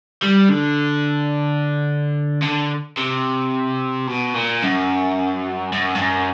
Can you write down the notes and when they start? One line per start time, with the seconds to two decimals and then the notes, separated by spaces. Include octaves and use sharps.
0.22 G3
0.49 D3
2.42 D3
2.97 C3
4.07 B2
4.34 A#2
4.63 F#2
5.73 F#2
5.95 G2
6.00 F#2